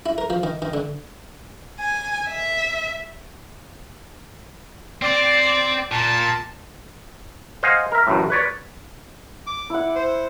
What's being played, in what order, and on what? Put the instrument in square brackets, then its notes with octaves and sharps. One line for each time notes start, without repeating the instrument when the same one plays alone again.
[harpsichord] E4
A#4
F3
D#3
D#3
D3
[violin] G#5
E5
[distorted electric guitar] C4 [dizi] D5
[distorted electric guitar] A#2 [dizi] A5
[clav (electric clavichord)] C5 D#5 F5 F#5 G#5
A#4 E5
A1 F#2 A2
B4 C#5 D5
[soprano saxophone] D6
[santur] E4 F#5
[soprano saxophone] C5